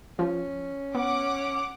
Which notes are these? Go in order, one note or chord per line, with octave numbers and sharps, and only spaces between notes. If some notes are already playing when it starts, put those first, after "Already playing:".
F3 C#4
B3 F#5 D6